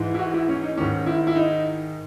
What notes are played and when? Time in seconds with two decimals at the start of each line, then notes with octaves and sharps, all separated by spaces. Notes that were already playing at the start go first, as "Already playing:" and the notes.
Already playing: G#2 E3
0.14 E4
0.19 F#4
0.34 E4
0.49 C#4
0.63 D#4
0.77 G#2 D#3 C#4
1.06 E4
1.27 E4
1.36 D#4